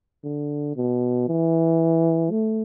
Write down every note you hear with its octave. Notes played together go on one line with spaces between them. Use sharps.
D3
B2
E3
A3